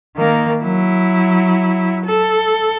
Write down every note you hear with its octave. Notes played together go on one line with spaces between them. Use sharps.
D#3 A#3
F#3 E4
A4